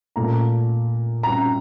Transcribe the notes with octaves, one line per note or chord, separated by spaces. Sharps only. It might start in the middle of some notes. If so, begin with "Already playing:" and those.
A#2 A3 A#5
A#5